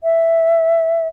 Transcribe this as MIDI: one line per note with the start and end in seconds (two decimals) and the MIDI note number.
0.03 1.07 76